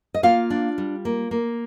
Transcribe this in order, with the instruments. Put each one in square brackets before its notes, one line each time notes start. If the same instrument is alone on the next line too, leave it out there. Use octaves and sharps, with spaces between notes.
[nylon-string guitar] D#5
A#3 F4 F5
D4
G3
A#3
A#3